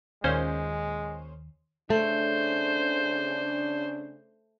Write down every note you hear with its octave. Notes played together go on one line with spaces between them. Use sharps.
D#2 A#2 G#3 C#4 C5
C#3 A3 D4 C5